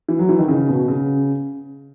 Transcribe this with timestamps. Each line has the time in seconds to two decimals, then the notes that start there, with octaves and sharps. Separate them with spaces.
0.08 E3
0.19 F#3
0.29 E3
0.39 D#3
0.48 C#3
0.69 B2
0.88 C#3